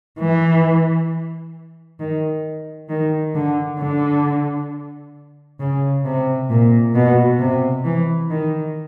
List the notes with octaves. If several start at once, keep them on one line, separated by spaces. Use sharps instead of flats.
E3
D#3
D#3
D3
D3
C#3
C3
A#2
B2
C3
E3
D#3